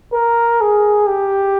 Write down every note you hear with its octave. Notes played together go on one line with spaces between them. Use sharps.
A#4
G#4
G4